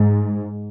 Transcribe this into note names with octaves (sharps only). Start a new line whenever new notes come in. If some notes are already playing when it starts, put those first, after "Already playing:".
Already playing: G#2